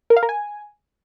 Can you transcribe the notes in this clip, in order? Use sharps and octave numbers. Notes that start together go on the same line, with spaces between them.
A#4
F5
A#4
G#5